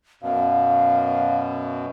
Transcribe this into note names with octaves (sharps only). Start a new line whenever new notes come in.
F#2 B2 F5